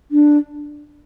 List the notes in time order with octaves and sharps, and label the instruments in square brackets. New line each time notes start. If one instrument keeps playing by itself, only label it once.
[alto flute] D4